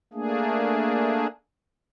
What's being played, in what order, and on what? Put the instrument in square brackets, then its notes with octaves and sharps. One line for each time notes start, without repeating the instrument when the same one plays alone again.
[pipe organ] A3 A#3 D4 G#4